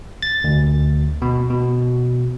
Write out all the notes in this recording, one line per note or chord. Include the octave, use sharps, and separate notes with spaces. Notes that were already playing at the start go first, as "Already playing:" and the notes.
A6
D2
B2
B2